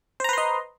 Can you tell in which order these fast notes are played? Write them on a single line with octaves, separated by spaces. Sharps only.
C5 A#5 B4 C6 D#5